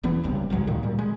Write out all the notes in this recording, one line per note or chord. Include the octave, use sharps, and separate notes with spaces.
E1 E2 E3 B3
F#1 C#2 G2 C3
G#1 C#2 F#3 G#3
D2 A#2 D#3
A#2 G3
G#3